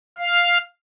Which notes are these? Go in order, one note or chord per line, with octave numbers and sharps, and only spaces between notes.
F5